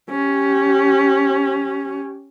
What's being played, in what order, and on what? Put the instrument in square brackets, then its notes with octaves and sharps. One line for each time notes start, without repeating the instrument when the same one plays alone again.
[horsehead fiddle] C#4 G4